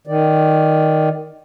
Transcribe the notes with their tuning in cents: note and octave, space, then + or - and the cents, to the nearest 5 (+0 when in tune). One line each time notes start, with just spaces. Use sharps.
D#3 +0 D5 +0